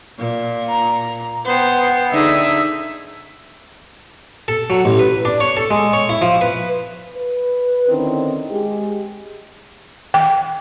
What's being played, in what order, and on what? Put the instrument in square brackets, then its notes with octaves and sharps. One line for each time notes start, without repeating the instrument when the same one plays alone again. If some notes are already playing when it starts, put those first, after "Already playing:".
[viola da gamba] A#2
[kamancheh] A#5
[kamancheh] B3 G5 [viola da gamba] C5
[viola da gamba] D3 D#4 G#4 [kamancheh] E5
[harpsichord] A4
F#3
A1
B4
D4
C#5
A4
G#3
C#5
E4
F3
B4
[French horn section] B4
D3 D#3 C4 C#4 D#4 E4
G#3 G4 G#4
[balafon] G5